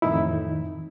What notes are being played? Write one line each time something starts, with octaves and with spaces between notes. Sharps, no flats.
F2 A2 D#3 E3 D#4 E4